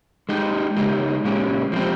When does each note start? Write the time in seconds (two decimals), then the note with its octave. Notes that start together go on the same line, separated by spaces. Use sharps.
0.29 G#3 D#4 G4
0.76 C#3 G#3 D#4 G4
1.25 A#2 G#3 C#4 G4
1.72 F3 G#3 C4 G4